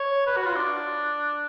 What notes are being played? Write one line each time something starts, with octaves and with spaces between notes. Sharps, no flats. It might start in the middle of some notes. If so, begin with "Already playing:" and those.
Already playing: C#5
B4
F#4
F4
D4